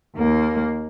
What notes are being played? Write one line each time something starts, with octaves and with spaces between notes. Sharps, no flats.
D#2 A#3